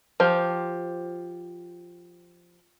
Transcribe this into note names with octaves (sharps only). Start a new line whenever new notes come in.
F3 G4 C5